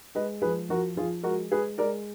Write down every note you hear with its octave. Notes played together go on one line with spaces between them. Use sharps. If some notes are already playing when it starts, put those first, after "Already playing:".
G#3 B4 D#5
F3 G#4 B4
F3 F#4 A#4
F3 F4 G#4
G#3 F#4 A#4
G#3 G#4 B4
G#3 A#4 D5